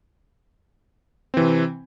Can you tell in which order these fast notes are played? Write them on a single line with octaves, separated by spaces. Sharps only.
C4 E3 C3